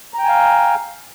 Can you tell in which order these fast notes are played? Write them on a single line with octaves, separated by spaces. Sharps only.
A#5 G5 G#5 F5